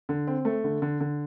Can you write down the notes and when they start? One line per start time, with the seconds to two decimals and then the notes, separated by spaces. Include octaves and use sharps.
0.09 D3
0.27 C4
0.45 A3
0.64 D3
0.82 D3
1.00 D3